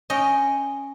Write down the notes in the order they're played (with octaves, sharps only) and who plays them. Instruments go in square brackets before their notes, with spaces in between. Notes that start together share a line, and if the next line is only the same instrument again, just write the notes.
[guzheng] C#4 D#5 G5